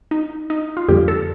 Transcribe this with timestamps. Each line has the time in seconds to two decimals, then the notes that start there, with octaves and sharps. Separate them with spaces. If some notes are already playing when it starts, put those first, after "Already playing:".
0.11 D#4
0.50 D#4
0.77 F4
0.89 F2 D3 G3 A#3 G4
1.08 A4